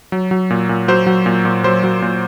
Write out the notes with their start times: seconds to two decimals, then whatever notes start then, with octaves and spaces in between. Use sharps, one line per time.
0.12 F#3
0.31 F#3
0.50 A#2
0.69 A#2
0.88 F#3 C5
1.07 F#3
1.26 A#2
1.45 A#2
1.64 F#3 C5
1.84 F#3
2.02 A#2